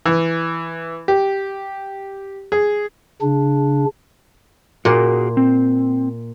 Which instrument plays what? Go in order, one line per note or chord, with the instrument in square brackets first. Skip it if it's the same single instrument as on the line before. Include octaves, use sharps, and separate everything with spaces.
[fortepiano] E3
G4
G#4
[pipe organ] C#3 D4
[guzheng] A#2 [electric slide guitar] F#4 G#4 A#4
[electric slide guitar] C4